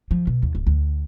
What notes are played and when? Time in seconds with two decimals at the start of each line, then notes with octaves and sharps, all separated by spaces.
0.11 F3
0.27 B2
0.42 D#2
0.55 D1
0.67 D2